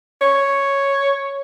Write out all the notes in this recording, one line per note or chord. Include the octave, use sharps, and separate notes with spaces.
C#5